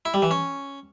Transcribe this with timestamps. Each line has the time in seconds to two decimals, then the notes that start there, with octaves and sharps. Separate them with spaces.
0.05 E4
0.14 G3
0.22 E3
0.31 C#4